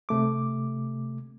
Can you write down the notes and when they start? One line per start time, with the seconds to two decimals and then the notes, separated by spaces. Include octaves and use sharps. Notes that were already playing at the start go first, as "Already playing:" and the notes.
0.09 C3 A3 D6